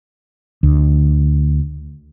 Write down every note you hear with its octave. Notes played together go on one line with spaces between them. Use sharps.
D2